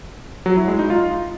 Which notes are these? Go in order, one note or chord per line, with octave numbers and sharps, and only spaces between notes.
F#3
E4
G#3
D#4
F4